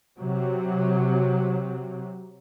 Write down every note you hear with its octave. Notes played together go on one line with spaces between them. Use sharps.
C3 F#3